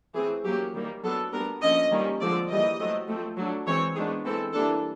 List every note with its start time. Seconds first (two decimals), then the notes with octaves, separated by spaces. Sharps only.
0.15 E3 A3 C4 G#4
0.45 F#3 A#3 C#4 G4
0.75 D#3 G3 A#3
1.03 F#3 B3 D4 A4
1.33 G3 B3 D4 A#4
1.62 D3 F3 A#3 C#4 D#5
1.91 D#3 G3 A#3 C#4
2.20 D3 F3 G#3 C4 D5
2.49 E3 G3 A#3 D#5
2.79 F#3 A3 C4
3.08 F3 A3 C4
3.37 F#3 A3 D4
3.67 E3 G#3 C4 C#5
3.96 D#3 G#3 B3 D4 G#4
4.25 E3 G#3 C4 A4
4.54 E3 G3 A#3 D4 A4